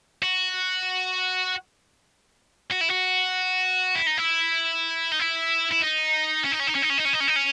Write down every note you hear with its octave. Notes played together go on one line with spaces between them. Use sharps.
F#4
F#4
E4
F#4
E4
D#4
E4
D#4
E4
E4
D#4
C#4
D#4
C#4
D#4
C#4
D#4
C#4
D#4
C#4
D#4
C#4
D#4
C#4